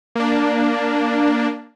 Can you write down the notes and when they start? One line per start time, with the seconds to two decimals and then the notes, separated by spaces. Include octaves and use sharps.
0.15 A#3 D4